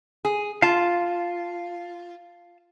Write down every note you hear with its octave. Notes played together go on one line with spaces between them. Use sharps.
G#4
F4 F5 A5